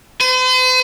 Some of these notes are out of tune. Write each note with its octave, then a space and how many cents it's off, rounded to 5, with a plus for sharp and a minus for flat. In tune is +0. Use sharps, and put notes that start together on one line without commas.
C5 -45